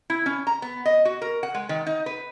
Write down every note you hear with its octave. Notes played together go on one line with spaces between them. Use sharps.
E4
C#4
A#5
B3
D#5
F#4
A#4
F#5
G#3
D#3
D#4
B4